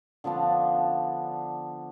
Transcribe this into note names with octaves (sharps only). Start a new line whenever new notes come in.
D3 F3 B3 D4